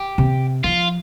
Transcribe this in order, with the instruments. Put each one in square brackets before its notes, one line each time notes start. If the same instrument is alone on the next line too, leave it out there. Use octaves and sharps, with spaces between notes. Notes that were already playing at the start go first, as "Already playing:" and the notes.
Already playing: [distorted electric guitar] G4
[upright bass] C3
[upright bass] F3 [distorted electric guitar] F4